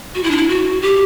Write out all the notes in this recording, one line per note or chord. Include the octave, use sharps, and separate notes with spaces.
F#4
E4
D4
E4
F#4
G4